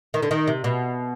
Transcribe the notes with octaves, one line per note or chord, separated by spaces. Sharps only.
D#3
D3
D#3
C3
B2